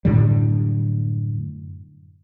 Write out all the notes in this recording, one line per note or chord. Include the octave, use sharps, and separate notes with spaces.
F#2 A2 D3 G3